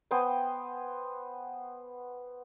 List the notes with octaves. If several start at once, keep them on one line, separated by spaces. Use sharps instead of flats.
B3 C5 G5 G#5